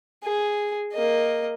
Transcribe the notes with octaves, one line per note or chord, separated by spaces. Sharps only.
G#4
A#3 D#5